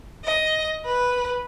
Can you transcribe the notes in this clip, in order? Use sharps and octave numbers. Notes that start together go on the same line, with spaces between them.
D#5
B4